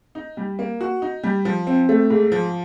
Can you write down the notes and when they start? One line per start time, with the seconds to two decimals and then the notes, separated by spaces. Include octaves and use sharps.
0.15 D#4
0.37 G3
0.59 A#3
0.81 F#4
1.02 D#4
1.24 G3
1.45 F3
1.67 C4
1.89 A3
2.10 G#2
2.32 F3